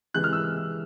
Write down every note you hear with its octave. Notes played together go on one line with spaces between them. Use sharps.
C3 E3 G#3 F#6
F6
E6